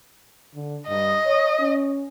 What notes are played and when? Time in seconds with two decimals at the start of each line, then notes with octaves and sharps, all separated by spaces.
0.55 D3
0.88 G2 D#5
1.26 C#5
1.60 C#4